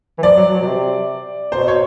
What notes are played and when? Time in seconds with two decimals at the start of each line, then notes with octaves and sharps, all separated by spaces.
0.18 E3
0.22 F3 D5
0.37 F#3
0.52 F#3
0.61 B2
0.66 C3
1.52 B2 C5
1.68 C#5